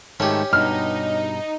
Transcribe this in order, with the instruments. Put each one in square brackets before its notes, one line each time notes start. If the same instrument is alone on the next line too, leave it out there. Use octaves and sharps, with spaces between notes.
[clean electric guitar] G#2 D#3 A3 [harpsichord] C#4 G4
[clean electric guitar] G2 B2 [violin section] D#4 [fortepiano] F6